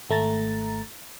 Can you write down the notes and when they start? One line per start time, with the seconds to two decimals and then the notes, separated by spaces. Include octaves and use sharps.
0.10 G#1 A3 A#5 A6